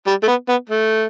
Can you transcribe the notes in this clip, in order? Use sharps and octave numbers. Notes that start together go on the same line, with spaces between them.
G3
A3
B3
B3
A3